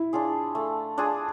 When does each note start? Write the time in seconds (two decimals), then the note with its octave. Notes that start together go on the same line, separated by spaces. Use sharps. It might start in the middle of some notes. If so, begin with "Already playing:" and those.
Already playing: E4
0.13 D4 F4 G#4
0.55 A3
0.98 D4 F4 G#4